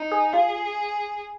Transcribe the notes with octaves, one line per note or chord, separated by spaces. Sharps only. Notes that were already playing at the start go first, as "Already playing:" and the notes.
Already playing: D#4
G#4
F4 G#4